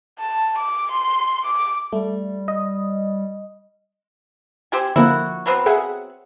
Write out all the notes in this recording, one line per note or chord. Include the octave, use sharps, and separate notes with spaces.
A5
D6
C6
D6
G3 A3
D#5
C4 G4 G#5
D3 F3 A#3 E4 F#4
F#3 B3 C4
G#4 E5 F#5